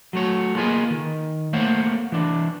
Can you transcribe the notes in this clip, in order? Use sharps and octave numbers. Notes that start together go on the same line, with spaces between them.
F#3 A3 C#5
A#3 F4 G#4 B4 D#5
D#3
A3 A#3 C5 C#5 F5 F#5
E3 D4